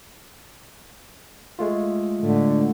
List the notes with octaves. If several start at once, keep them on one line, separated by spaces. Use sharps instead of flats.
G#3 A3 F4
A2 D3